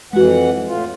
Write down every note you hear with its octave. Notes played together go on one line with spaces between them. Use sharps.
F2 E3 G#3 F#4 F#5
A2 F4